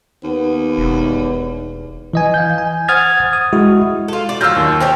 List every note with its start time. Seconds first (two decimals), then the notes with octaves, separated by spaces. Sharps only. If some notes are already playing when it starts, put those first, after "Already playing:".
0.24 D#2 B3
0.78 E1
2.13 E3 D#5 G#5
2.34 F5 G6
2.58 G#5
2.88 C5 F#5 D#6 F6 G#6 A6
3.33 D#6
3.53 G#3 E4 F#4
4.08 F4 A4
4.29 D5
4.41 F#3 F4 E6 F6 G6
4.56 D#2
4.80 C4 G4 C#5